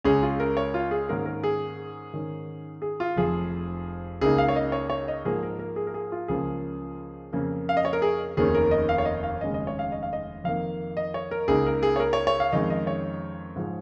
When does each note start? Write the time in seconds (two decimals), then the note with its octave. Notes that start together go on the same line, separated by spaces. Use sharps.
0.04 C#2 C#3 G#3 C#4 G#4
0.23 F4
0.40 A#4
0.57 C#5
0.74 F4
0.91 G#4
1.09 G#2 D#3 A#3 C#4 A#4
1.26 A#4
1.43 G#4
2.13 G#2 D#3 C#4
2.82 G#4
3.00 F4
3.16 F1 F2 F3 G#4
4.21 C#2 C#3 A#3 D#4 G#4
4.38 F5
4.48 C#5
4.56 D#5
4.72 C#5
4.90 C#5
5.08 D#5
5.25 G#2 F3 A#3 G#4
5.43 A#4
5.59 A#4
5.76 G#4
5.87 A#4
5.94 G#4
6.12 F4
6.28 C#2 C#3 F3 A#3 C#4 G#4
7.33 F2 C#3 A#3
7.69 F5
7.77 D#5
7.85 C#5
7.93 A#4
8.02 G#4
8.37 F1 D#2 D#3 A#3 C#4 G#4
8.55 A#4
8.71 D#5
8.89 F5
8.98 C#5
9.05 D#5
9.23 F5
9.41 F1 D#2 C#3 G#3 D#5
9.54 D#5
9.67 C#5
9.79 F5
9.92 D#5
10.03 F5
10.13 D#5
10.44 F2 D#3 A#3 F5
10.97 D#5
11.14 C#5
11.31 A#4
11.48 C#2 C#3 A#3 D#4 G#4
11.66 A#4
11.83 G#4
11.96 C#5
12.00 A#4
12.13 C#5
12.27 C#5
12.40 F5
12.52 F2 D#3 G#3 C#4 D#5
12.70 D#5
12.87 C#5
13.56 G#2 F3 G#3